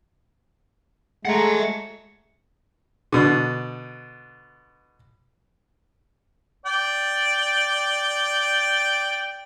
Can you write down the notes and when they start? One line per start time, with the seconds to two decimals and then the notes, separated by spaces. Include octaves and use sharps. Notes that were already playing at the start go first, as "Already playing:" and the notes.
1.25 G#3 A3 F#5 A#5
3.12 B2 D3
6.66 D5 G5